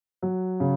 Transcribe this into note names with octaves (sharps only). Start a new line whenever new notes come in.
F#3
C#3